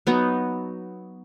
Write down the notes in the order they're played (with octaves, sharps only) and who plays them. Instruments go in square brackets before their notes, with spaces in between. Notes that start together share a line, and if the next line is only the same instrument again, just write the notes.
[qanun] F#3 B3 D#4